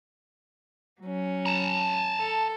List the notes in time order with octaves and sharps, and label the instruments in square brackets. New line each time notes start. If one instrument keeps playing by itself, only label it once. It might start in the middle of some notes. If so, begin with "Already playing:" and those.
[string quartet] F#3 C#4
[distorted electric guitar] A5 A#5
[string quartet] A4